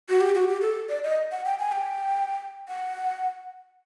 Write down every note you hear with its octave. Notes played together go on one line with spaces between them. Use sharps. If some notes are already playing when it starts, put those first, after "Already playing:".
F#4
G4
F#4
G4
A4
D5
D#5
F#5
G5
G#5
G5
F#5